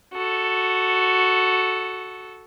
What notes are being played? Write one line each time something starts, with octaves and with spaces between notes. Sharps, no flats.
F#4 A4